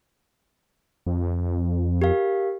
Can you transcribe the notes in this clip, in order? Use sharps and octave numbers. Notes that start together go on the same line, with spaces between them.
F2
G4 A#4 F5